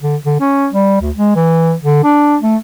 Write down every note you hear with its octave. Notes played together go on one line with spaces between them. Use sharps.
D3
D3
C#4
G3
D2
G#3
E3
D3
D4
A3